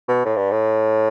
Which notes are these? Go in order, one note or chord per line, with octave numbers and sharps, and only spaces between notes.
B2
A2
G2
A2